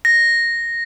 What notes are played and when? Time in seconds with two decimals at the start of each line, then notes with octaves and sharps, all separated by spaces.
0.05 A#6